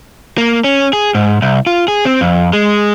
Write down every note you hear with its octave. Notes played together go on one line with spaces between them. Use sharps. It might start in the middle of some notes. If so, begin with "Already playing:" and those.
A#3
C#4
G#4
G#2
C2
F4
G#4
C4
F2
G#3